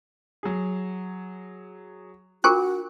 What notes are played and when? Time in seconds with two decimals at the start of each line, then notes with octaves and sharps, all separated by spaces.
0.43 F#3 G#4
2.44 D4 F4 F#4 A#4 C#6 D6 F#6